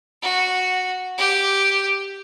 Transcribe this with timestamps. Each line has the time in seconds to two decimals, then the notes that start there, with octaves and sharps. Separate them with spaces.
0.22 F#4
1.18 G4